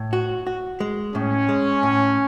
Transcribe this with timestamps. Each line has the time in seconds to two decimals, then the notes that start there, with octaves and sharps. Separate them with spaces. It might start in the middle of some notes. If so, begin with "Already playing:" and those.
Already playing: A2
0.13 F#4
0.47 F#4
0.80 G#3
1.15 A2 C#4
1.49 G#3
1.83 A2